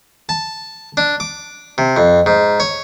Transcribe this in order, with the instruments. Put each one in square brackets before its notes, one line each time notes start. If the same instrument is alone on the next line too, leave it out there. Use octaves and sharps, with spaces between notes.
[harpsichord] A5
D4
D6
C3
F2
G#2
C#5